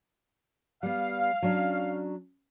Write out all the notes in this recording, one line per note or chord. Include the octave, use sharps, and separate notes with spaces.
G3 B3 F5
F#3 C#4 D4